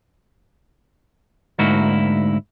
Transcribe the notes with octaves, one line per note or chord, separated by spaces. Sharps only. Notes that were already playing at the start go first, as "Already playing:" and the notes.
D2 G#2 A#3 D#4 E4 F#4